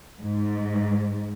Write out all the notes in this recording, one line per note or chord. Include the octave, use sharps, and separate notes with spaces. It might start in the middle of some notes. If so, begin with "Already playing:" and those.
G#2